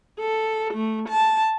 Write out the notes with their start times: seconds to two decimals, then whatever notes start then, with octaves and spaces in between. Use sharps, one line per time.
0.20 A4
0.74 A3
1.09 A5